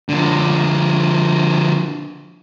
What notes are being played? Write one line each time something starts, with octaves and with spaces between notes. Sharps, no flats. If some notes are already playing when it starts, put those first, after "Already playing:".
D3 F3